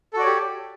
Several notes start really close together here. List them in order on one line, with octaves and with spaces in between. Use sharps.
A4 F#4 D5 C#5 G4